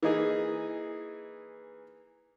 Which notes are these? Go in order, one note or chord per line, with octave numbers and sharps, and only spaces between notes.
E3 A#3 D#4 G#4